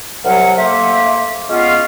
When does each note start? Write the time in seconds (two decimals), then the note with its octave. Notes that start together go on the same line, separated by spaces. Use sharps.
0.25 C2 F#3 F5 F#5
0.58 A3 A#3 C5 E5
1.50 G#3 B3 C#4 F4